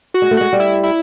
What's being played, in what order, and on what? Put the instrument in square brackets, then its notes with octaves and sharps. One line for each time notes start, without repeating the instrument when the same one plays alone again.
[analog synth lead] F#4
[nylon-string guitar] G#3
A3
[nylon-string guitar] G#3 [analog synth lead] F#4
[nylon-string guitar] G3
[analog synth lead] E4
E4